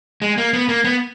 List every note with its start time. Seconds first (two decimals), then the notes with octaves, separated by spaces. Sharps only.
0.22 G#3
0.38 A#3
0.53 B3
0.69 A#3
0.84 B3